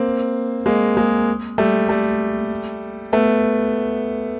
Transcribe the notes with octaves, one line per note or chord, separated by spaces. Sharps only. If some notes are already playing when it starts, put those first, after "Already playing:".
Already playing: A#3 C4
G#3 A#3
G#3 A#3
G3 A3
G3 A3
A3 B3